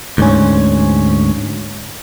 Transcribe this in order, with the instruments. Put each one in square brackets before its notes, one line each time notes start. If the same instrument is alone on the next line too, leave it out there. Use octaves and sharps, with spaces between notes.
[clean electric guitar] D2 G#2 C#4